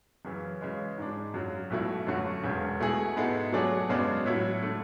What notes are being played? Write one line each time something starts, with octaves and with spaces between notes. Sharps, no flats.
F#2 C#3 E3
C#3 E3 G#3
G#2 G#3 D4
F#2 C#3 F#3
B1 B2 A3 E4
F#2 D3 A3 C#4 F#4
E1 E2 C#3
B2 A3 E4 G#4
G#2 G#3 B3 E4 A4
B2 F#3 A3 D4 G#4
F#2 C#3 G#3 B3 D4
A2 F#3 A3 E4 A4
D3 A3